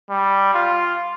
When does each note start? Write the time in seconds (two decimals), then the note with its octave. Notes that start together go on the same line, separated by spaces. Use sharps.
0.10 G3
0.54 F4